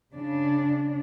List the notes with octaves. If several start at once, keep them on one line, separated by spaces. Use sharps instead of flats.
C#3 D4